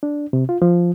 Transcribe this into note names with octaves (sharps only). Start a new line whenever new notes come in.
D4
C3
F4
F3